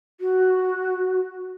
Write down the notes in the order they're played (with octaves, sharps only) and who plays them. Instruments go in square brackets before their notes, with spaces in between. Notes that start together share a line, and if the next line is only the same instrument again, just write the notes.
[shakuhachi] F#4